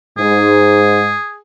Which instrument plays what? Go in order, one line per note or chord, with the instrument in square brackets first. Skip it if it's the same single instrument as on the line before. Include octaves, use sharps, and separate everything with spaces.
[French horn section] G#2 [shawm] G#4